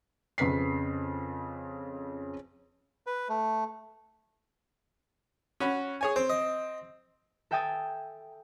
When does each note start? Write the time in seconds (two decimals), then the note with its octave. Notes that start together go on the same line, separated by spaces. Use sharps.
0.38 F2 C#3 B4 B6 C7
3.07 B4
3.29 A3
5.60 C#4 F#4 B5
6.01 G#4 C#5 G#5
6.16 C4 C5
6.30 D#5
7.51 A4 E5 G5 G#5 D#6 A6